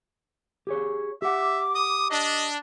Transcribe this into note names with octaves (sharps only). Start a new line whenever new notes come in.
G4 G#4 C#5
G4 E5 F#5 D6
D#6
D4 D#5